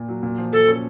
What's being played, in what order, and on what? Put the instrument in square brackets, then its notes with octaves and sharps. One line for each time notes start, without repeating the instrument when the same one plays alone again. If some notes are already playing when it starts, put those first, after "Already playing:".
Already playing: [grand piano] A#2
F#3
A#2
F3
[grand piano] F3 [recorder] A4
[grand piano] C#4